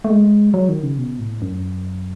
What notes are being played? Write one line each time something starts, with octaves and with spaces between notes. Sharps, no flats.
A3
G#3
F#3
D#3
C#3
B2
A2
F#2